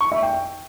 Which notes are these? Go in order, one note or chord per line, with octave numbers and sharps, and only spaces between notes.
C#6
E5
G5